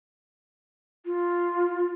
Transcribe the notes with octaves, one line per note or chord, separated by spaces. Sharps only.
F4